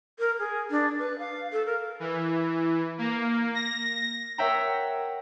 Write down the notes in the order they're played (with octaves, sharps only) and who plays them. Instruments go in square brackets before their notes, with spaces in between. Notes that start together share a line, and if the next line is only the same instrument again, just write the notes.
[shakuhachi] A#4
G#4
D4
B4
F5
A4
A#4
[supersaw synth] E3
A#3
A#6
[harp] A#4 C#5 E5 F#5 G5 A#5